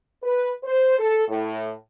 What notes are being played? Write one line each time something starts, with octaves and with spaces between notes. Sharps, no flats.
B4
C5
A4
A2